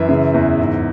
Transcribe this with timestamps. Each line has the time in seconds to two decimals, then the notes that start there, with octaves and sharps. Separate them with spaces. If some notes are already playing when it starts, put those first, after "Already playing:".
Already playing: F#2 E3 E5
0.09 C#3
0.34 E2
0.59 G#2